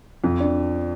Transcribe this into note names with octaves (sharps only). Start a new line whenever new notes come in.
F2
D4